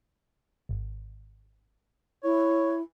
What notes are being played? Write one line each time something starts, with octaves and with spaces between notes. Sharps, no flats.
G#1
E4 C#5